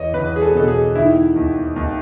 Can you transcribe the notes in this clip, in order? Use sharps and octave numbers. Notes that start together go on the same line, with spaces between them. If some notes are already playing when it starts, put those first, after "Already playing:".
Already playing: E2 C#5 D#5
E2 B4
G#4
A4
B2 A4
G#4
D#3 E4
D#2
D#2